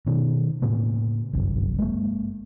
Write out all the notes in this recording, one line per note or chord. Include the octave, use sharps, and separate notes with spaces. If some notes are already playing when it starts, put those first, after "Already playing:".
B2 D#3
A2 C#3 A#3
G1 C2 F#2
G#3 A#3